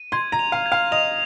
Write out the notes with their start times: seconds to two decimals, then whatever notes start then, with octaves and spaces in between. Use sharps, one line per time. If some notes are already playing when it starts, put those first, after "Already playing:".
Already playing: D#7
0.12 C6 G#6
0.32 A#5
0.39 F7
0.52 F5
0.66 G#6
0.72 F5
0.92 D#5 F7